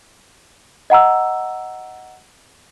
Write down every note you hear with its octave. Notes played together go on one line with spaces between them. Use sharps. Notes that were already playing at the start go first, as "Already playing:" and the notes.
D#5 F#5 A#5 E6